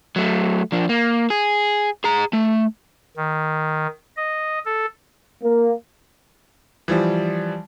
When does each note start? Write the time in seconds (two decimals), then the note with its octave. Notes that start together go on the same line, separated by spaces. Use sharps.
0.16 F#3 A3
0.72 F3 D4
0.89 A#3
1.30 G#4
2.04 G#4 A#5
2.33 A3
3.17 D#3
4.17 D#5
4.65 A4
5.43 A#3
6.88 E3 F3 G3